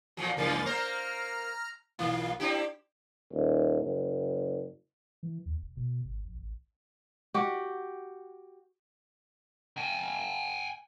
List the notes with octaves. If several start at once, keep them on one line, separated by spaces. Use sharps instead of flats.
E2 A#2 F3 F#3
C#2 F#2 E3 F3 A#3 A6
A#3 A#4 C5 A#5 F6
B1 E3 A#3 F4
C4 D4 E4 G4
D#1
F#1
E3
D#2
E1
B2
G#1
A#1
A1
F#4 G4
G5 G#5